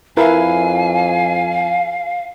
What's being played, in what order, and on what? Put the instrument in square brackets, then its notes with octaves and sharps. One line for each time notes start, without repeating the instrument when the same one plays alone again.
[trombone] F2 [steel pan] E4 A#4 B4 [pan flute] F5 [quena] G#5